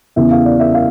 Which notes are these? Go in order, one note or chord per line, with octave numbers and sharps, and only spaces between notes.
E2 C#3 E3 E5
F5
D5
E5
F5